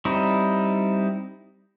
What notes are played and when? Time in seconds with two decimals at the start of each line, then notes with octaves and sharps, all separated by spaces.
0.05 G3 C4 D#4 E4